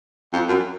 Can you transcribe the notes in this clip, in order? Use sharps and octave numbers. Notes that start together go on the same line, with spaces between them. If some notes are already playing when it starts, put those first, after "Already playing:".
F2
F#2